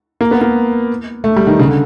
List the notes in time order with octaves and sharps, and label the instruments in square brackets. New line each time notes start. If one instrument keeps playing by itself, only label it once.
[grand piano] A#3
B3
A#3
A3
G3
D#3
C#3
D3